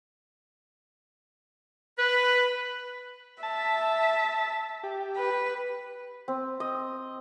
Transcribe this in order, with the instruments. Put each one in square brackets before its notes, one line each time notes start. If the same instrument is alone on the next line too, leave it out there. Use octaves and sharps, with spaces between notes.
[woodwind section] B4
[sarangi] E5 [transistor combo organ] A5
[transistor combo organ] G4
[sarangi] B4
[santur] C4
D#5